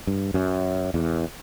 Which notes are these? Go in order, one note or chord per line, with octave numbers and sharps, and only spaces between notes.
G2
F#2
E2